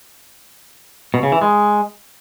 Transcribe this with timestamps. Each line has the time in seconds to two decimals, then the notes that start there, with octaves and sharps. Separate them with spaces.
1.14 B2
1.23 C#3
1.32 E3
1.42 G#3